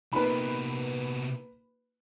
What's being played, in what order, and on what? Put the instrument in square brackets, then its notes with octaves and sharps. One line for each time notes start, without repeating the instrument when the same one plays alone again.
[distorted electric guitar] C3 B3 [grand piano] A#3 D#4 F4 [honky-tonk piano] B4 B5